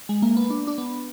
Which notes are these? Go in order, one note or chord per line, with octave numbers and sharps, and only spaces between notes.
G#3
A#3
B3
D4
D4
B3